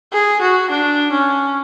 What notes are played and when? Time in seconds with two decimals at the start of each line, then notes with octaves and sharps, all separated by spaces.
0.13 G#4
0.41 F#4
0.70 D4
1.12 C#4